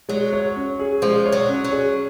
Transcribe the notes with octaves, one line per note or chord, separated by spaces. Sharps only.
F#3 G#3
C#5
C#4
G#4
F3 G#3
C#5
F#3
C#4
F#3
G#4